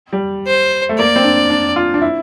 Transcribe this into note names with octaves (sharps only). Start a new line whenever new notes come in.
G3
C5
A3
A#3 D5
C4
D4
D4
F4
D4
E4